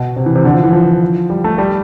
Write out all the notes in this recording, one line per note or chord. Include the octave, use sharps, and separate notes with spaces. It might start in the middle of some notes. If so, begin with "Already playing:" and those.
Already playing: B2
C3
E3
C3
D3
F3
E3
F3
G3
A3
G3